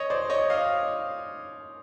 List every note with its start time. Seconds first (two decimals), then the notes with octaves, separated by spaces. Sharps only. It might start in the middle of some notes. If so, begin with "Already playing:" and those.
Already playing: C#5 D#5
0.10 C5 D5
0.30 C#5 D#5
0.50 D#5 F5